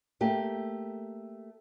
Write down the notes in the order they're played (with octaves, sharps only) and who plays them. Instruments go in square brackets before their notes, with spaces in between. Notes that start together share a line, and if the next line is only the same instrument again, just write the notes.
[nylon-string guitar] A3 A#3 G4